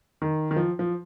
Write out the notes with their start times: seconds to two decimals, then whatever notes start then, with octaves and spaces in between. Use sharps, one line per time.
0.22 D#3
0.51 D#3
0.56 F3
0.79 F3